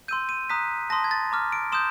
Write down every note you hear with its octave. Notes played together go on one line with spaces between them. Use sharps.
C6 E6 G6 D#7
D#7
A#5 D#6 F#6 B6
A5 C6 D#6 A#6
G#6
A6
A#5 D6 F6
D7
C6 D#6 G6 E7